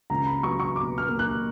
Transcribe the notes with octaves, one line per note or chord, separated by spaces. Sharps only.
C#2 A#5
B5
F#3 C#6
C#6
B2 D6
F6
A#3
F#6